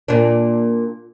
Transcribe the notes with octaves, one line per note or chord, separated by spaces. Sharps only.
A#2 D4